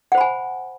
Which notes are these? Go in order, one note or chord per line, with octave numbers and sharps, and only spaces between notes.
C5 F#5 G#5 B5